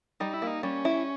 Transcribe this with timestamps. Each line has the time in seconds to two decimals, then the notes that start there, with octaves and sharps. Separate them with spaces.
0.20 G3 D#4
0.33 E4
0.42 A#3 D#4
0.63 G3 C#4
0.85 E4